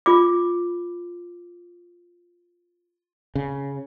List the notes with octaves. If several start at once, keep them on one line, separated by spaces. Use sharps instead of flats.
F4 D6
C#3